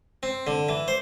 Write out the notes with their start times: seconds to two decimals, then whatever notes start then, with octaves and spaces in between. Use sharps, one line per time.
0.23 C4
0.47 D3
0.69 E3
0.88 C5